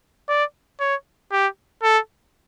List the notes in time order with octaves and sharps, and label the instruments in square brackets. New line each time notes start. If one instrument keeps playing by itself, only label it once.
[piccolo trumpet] D5
C#5
G4
A4